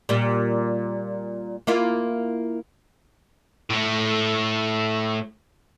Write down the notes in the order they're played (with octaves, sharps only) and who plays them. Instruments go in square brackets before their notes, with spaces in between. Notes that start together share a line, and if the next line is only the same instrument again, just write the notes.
[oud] A#2 G3
A#3 E4 F4
[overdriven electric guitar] A2 A3